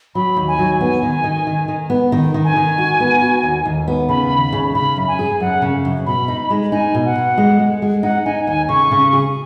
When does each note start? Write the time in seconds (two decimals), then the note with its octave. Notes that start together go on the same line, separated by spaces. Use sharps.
0.15 F#3 B5
0.37 D#2
0.48 G#5
0.59 F#3
0.80 B3 G#5
1.03 D#3
1.24 D#3
1.47 D#3
1.68 D#3
1.90 B3
2.12 D#3
2.34 D#3
2.44 G#5
2.56 D#3
2.78 F#4
3.00 B3
3.22 F#4
3.43 D#2
3.65 D#2
3.88 B3
4.09 C#3 B5
4.31 D#2
4.52 C#3
4.75 C#3 B5
4.97 F#2
5.08 G#5
5.19 G#4
5.40 F#2 F#5
5.62 C#3
5.85 F#2
6.06 B2 B5
6.28 D#4
6.50 G#3
6.72 D#4 G#5
6.95 B2
7.05 F#5
7.16 B2
7.38 G#3
7.59 G#3
7.82 G#3
8.03 D#4 F#5
8.25 D#4 G#5
8.47 D#2 G#5
8.69 C#3 C#6
8.91 C#3
9.13 G#4